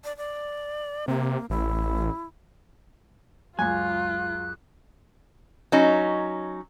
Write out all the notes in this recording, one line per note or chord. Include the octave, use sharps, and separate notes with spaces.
D5
D5
C3 A#3
A1 E4
C#2 F#2 F4 G#5 F#6
F#3 C#4 D#4